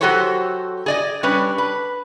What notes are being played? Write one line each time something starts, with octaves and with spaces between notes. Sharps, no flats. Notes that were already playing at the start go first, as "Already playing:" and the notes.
F#3 F#4 G4 A4 C5 C#5
G#4 D5 D#5
G3 C#4 D4 B4
B4